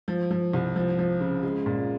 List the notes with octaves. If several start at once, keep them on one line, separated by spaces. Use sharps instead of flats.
F3
F3
C2
F3
F3
C#3
G#3
A#2